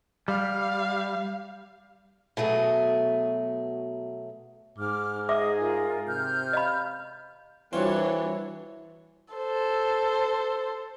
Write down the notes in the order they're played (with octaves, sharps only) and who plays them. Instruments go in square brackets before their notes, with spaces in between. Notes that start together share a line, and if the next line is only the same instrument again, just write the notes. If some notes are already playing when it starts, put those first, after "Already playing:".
[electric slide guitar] G3 [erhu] F5
[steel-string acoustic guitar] B2 F#3 A3 G#4
[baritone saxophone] G#2 [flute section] D6 F6
[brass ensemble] G#4 [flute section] D#5 D#6 [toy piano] E5 D6
[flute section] F4 A#4
[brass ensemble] C3 [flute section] F6 G6
[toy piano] D#5 F5 B5
[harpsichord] C2 C4 F4 [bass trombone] E3 [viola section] D4 F#4 C#5
[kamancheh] A4 C5